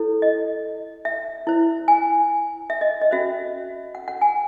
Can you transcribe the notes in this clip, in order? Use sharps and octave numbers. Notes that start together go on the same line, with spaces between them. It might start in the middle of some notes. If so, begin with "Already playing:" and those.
Already playing: E4 A4 C#5
D#5
E5
E4 C5
G#5
E5
D#5
D#5
C#4 F#4 C5 E5
F#5
F#5
G#5